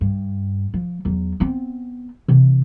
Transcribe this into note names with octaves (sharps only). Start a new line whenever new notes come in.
G2
F3
E2 F#3
B3 C4
C3 E3